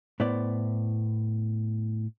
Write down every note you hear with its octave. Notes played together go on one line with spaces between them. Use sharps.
A2 B3 E4 C5 D5